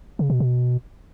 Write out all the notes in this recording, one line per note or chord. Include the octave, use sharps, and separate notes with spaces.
C#3
B2
B2